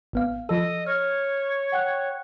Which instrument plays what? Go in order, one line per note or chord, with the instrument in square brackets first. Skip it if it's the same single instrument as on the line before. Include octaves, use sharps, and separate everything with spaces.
[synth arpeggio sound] A1 B3 F5
[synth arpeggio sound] F3 A4 [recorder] D#5 [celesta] E6
[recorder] C#5 [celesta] F6
[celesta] F#5 G5 F#6